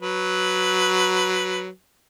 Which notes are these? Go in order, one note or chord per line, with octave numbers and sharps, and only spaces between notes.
F#3 B4